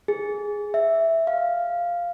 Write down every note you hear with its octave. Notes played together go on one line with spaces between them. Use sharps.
G#4
E5
F5